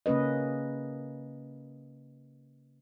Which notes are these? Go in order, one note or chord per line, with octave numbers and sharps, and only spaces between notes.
C#3 A#3 C#4 B4 D#5